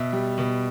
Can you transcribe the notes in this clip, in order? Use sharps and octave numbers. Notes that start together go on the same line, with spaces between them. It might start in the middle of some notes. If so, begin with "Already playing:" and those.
Already playing: B2 E5
G3
B2